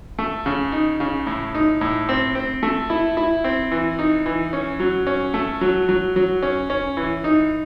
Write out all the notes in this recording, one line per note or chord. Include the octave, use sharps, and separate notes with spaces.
A3
C#3
D#4
C#3
A2
D#4
A2
C4
C4
A3
E4
E4
C4
E3
D#4
E3
C#4
F#3
C#4
A3
F#3
F#3
F#3
C#4
C#4
E3
D#4